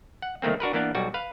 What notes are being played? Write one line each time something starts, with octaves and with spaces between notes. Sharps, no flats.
F#5
C2 D#3 A3 A#3 C4
D4 F#4 A#4 B4
E3 A#3 B3 D4
B1 G3 F#4
B4 F5